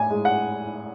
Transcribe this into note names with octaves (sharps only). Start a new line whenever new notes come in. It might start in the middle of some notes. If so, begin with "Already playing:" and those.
Already playing: A2 G#5
G#3
F#5